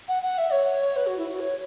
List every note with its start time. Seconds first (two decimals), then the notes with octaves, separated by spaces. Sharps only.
0.08 F#5
0.22 F#5
0.37 E5
0.52 C#5
0.96 B4
1.06 F#4
1.17 E4
1.28 F#4
1.39 C#5